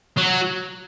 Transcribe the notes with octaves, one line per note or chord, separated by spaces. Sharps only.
F#3